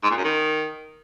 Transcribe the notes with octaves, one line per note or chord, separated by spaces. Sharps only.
G#2
A#2
F#2
D#3